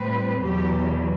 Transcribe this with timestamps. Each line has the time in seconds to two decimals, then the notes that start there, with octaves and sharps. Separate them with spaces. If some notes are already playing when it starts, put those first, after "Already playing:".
Already playing: A2 G3 C4 B4
0.40 E2 B2 F#3 G4